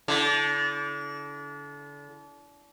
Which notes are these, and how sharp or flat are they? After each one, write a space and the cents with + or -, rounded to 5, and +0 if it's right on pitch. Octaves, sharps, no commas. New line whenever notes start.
D3 -35 E4 +10